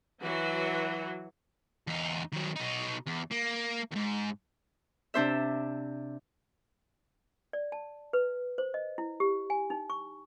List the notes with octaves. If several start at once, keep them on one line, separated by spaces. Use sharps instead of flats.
E3 F#3 F#4
E2 D#4
D#3 F#3
B2 D#4
E2
A#3
D#2 G#2
C3 D4 C5 E5
D5
A5
B4
C5
D#5
E4
G4
G#5
D#4
C#6